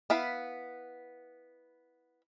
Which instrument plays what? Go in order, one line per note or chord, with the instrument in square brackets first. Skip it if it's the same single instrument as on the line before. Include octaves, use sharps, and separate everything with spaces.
[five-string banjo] B3 E4 F5 B5